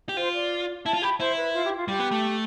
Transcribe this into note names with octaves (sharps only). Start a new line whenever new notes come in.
G4
F4 C5
D5
E4 A5
F4
G4 B5
E4 C5
B4
F4
G4
F4
G3 G4
B3
A3